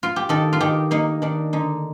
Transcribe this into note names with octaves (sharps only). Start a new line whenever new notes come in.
F4
G4
D#3 A4
F4
D#3 G4
A#3 D#4
D#3 D4
D3 D#4